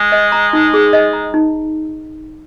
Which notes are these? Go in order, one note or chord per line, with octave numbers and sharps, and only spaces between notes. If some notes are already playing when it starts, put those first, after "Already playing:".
Already playing: G#3
D#5
A#5
D#4
G#4
D#5
A#5
D#4